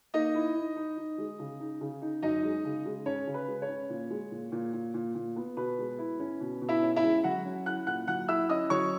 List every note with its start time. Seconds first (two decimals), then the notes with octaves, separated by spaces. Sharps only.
0.14 A#3 D#4 D#5
0.35 E4
0.55 D#4
0.76 D#4
0.97 D#4
1.18 G#3
1.39 C#3
1.60 D#4
1.81 C#3
2.02 D#4
2.22 F#2 D#4 D#5
2.43 G#3
2.65 C#3
2.85 G#3
3.06 C#4 C#5
3.27 C#3
3.34 B4
3.48 G#3
3.62 C#5
3.68 C#4
3.90 A#2
4.10 G#3
4.31 A#2
4.52 A#2
4.74 A#2
4.94 A#2
5.15 A#2
5.36 B3
5.57 B2 B4
5.78 G#3
5.99 E4
6.20 C#4
6.41 B2
6.62 B2
6.69 E4 E5
6.82 C#4
6.96 E4 E5
7.03 G#3
7.24 F#3 F#4 F#5
7.45 C#4
7.66 E4 F#5 F#6
7.86 A#2 F#5 F#6
8.07 F#3 F#5 F#6
8.28 E4 E5 E6
8.49 C#4 D#5 D#6
8.70 F#3 C#5 C#6